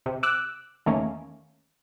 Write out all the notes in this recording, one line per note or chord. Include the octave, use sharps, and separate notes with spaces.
C3
D6 E6 F#6
E2 D#3 A3 A#3 C#4